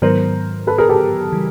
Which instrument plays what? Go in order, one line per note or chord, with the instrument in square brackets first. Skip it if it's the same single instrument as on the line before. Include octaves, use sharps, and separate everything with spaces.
[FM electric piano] G#2 D#3 F#3 B3 [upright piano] A#4 C5
[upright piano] A4 B4
G#4 A#4
G4 A4
[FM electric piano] C#3 E3 G3